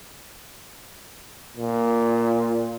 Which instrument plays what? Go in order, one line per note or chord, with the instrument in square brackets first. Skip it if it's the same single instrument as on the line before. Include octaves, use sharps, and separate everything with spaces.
[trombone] A#2